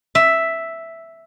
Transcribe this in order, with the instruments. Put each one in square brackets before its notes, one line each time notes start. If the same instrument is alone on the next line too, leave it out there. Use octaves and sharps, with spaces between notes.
[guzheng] E5